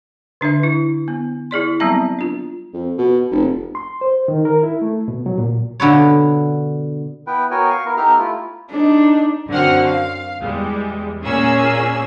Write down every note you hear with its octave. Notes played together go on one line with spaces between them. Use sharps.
D3 D4 B4 E5
E4
B3
E4 G#4 D5 C6
F#3 G3 B3 C4 E5 A#5
D4 F4
F2
B2
F1
C6
C5
D#3
A#4
E4
A3
B2
F#3
A#2
B2 D3 B4 C#5
B3 E4 B4 G5
B3 F#4 A#4 C#5 G5 G#5
F5 C#6
B3 E4 A#4
B3 D#4 G4 A4 A#5 F6
A3 E4 F4
D4 D#4
F#2 D3 C4 F#4 F#5 F6
F5
E2 G3 G#3
A#2 A#3 C#4 G#4 E6